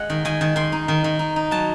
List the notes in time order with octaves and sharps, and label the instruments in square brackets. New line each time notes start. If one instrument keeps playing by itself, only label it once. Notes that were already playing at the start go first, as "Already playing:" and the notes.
Already playing: [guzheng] G#3 F#5
D#3
D#3 G#5
D#3
D#3 C6
D#4
D#3
D#3
D#4
D#4
F#3 A5